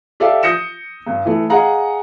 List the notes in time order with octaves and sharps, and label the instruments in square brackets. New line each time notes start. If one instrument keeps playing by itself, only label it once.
[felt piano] G4 A4 D5 E5 F5
D#6 G6 A#6 C#7 E7
G2
E3 A3
G#4 D#5 F5 F#5 A#5